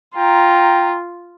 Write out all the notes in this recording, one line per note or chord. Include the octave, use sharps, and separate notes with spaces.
F4 G5 A#5